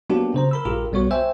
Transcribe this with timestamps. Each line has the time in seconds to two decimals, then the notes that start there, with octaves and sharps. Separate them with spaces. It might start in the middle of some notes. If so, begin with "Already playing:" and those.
0.10 F#3 A#3 B3 D4 F#4 G4
0.34 C#3 C5 A#5
0.51 A#4 B5 E6
0.65 A#1 G2 F4 G4 G#4 A#4
0.92 B1 G3 B3 F#4 C#5 C#6
1.11 C5 E5 G5 G#5 E6